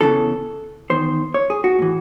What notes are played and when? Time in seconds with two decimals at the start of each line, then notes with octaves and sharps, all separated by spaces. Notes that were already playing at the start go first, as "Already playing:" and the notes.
0.01 E2 C#3 E3 A4
0.90 E2 D#3 C5
1.34 C#5
1.50 G#4
1.64 F#4
1.79 A2 E3